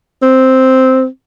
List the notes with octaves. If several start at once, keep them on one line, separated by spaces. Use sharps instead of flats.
C4